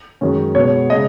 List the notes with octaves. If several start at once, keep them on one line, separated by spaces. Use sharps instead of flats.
F#2 D#3 G#3 C#4
B2 G#3 B3 C#5
C#3 G#3 D#5